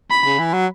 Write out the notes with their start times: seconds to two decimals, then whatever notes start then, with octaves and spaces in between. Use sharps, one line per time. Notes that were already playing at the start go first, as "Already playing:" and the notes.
0.11 B5
0.25 C#3
0.39 E3
0.53 F#3